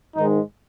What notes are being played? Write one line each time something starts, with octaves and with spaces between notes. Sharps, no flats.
G#2 D#3 G#3 D#4